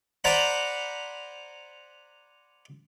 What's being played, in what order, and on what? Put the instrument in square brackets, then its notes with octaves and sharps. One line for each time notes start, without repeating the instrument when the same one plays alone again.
[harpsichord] C5 D5 F#5 G#5 A#5 B5